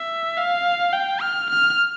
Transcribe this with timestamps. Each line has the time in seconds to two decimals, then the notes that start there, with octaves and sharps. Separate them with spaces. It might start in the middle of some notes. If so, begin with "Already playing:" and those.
Already playing: E5
0.37 F5
0.93 G5
1.21 F6
1.50 F6